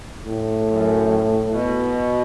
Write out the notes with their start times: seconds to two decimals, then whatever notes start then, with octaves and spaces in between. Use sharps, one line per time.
0.24 A2
0.66 F#2
1.49 B2